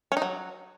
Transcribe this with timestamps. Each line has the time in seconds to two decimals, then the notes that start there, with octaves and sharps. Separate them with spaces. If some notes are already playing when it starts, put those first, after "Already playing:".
0.12 C#4
0.17 D#4
0.22 F#3